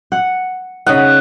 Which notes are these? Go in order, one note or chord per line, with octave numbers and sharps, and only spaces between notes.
F#5
C#3 D#4 F#5